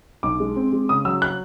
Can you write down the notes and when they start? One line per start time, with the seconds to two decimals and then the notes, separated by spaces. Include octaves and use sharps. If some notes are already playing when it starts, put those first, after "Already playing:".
0.23 B1 D6
0.40 G#3
0.56 C4
0.73 G#3
0.89 C#3 D#6
1.05 F#3 E6
1.22 F#6